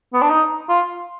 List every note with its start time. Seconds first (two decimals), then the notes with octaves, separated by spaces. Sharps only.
0.13 B3
0.22 D4
0.30 D#4
0.69 F4